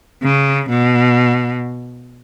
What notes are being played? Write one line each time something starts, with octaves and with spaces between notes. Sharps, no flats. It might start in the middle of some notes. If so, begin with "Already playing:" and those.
C#3
B2